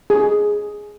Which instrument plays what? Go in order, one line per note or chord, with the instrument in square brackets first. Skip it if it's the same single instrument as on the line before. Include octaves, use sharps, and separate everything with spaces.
[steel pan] G#4